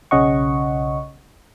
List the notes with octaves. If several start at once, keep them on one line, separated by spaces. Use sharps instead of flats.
B1 C#3 C#4 D#5 F#5 C#6